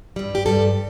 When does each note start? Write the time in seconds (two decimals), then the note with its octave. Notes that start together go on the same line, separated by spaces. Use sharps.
0.16 G2 G3
0.35 G4
0.46 G2 G3 A4